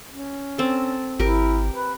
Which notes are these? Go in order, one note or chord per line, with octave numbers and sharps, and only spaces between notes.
C#4
C4 A4
G#1 E4 G4 A#4
B4